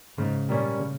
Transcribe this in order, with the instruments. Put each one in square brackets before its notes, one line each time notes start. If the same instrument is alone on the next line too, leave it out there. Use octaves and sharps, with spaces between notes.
[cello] G#2 [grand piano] C#3
[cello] A#2 [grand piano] G3 A#3 C#4
[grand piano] C#3